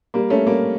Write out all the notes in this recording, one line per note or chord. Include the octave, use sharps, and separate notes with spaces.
G3 A#3
A3 C#4
G3 A#3